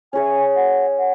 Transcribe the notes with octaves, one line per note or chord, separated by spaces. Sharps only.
C#4 G#4 C#5 E5 G#5
F#5
F#5